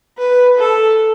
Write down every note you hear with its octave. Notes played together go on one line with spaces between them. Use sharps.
B4
A4